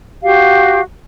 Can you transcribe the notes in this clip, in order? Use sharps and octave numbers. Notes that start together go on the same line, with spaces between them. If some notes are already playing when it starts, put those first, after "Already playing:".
F#4 G4 F5